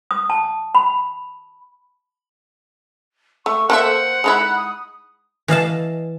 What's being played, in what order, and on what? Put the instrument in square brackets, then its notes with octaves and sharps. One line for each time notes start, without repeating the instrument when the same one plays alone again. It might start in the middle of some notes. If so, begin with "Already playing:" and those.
[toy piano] D#6
A5
B5
[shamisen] A3 [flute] C#6
[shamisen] A#3 A4 E5 [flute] C5 [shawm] F#5
[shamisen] G#3 D#4 E4 [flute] B5
[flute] D#6
[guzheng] E3 D#5 F5 A5